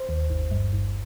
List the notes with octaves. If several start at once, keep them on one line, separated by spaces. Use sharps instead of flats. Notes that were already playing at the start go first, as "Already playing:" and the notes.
Already playing: C5
D#2
G1
G2
G1